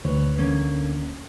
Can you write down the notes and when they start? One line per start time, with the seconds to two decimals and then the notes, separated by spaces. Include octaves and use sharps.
0.05 D2 B4 C#5
0.38 D3 A#3 C#4